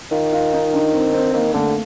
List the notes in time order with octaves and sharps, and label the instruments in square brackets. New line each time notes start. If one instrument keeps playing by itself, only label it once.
[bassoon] D#3 [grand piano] F4
[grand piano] F4
D#4
D4
C4
C4
[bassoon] D#3 [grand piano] A#3
[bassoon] D3 [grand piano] A3